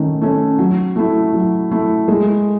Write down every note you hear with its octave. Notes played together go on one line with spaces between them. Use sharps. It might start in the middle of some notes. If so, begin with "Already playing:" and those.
Already playing: D#3 A3 C#4
A3 C#4
F#3
A3 E4
F#3
A3 E4
G#3